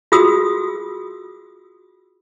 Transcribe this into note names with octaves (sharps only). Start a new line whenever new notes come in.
F4 F#4 G#4 D#6 E6